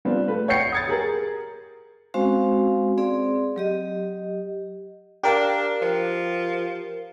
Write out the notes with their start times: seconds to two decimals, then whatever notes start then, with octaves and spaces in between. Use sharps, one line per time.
0.05 G3 B3 C4 D4 F4
0.28 A3 B4
0.48 C#5 F#5 G5 G6 C7 C#7
0.72 D#6 G#6 A6
0.87 G4 G#4 A#4
2.14 G#3 C4 C#4 F#4 C5 F5
2.98 C4 G#4 D5
3.56 F#3 G4 D#5
5.23 D4 G4 A#4 F5
5.82 F3